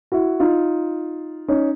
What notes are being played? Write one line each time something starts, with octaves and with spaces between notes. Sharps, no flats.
E4 F#4
D#4 F4
C#4 D#4